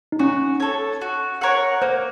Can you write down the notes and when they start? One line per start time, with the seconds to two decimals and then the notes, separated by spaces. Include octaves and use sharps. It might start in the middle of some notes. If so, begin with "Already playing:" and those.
0.12 D#4
0.19 C#4 F#4
0.60 A4 C#5
1.01 F#4
1.41 A#4 C#5 F#5
1.82 A#3 C5